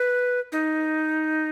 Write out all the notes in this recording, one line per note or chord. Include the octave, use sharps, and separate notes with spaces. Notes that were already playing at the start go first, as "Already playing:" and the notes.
Already playing: B4
D#4